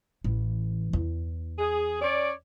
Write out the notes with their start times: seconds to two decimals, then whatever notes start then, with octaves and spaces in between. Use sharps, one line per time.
0.24 A1 E3
0.93 E2
1.58 G#4
2.00 C#4 C#5 D5